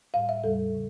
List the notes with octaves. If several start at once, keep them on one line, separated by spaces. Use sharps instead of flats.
A2 G3 F5
E5
E2 C#3 G3 A4
C#3